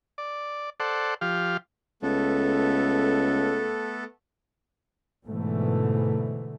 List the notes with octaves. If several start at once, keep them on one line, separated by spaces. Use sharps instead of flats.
D5
A4 C5 D5 F#5
F3 G4 F5
C#2 A3 B3 A4
G#2 B2 D3 E3 A3